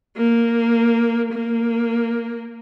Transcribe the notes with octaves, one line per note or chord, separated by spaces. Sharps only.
A#3
A#3